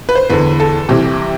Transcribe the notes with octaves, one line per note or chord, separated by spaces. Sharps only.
B4
C5
E2 D3 B4
A4
C2 C3 E3 G4